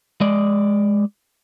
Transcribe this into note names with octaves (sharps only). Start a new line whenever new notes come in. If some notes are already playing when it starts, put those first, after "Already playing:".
G#3 D5